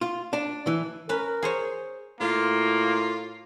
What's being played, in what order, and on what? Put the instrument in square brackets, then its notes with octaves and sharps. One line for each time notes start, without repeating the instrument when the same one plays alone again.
[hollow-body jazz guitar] F4
D4
E3
[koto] C#4 B4 [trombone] A#4
[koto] G#4 C5 C#5
[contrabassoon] A2 [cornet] A#3 [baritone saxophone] F4